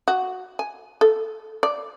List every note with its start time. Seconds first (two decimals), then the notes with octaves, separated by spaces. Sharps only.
0.08 F#4
0.59 G#5
1.01 A4
1.63 D5